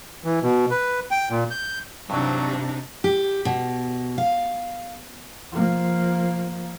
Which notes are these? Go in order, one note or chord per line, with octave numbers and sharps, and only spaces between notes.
E3
B2
B4
G5
A#2
G6
G2 C3 E3 F#3 D4 D#4
G4
B2
F5
F3 A#3